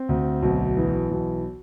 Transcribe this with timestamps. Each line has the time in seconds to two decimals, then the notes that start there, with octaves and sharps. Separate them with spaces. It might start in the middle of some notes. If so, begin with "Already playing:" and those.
Already playing: C4
0.09 D2
0.42 B1
0.77 E3
1.11 B1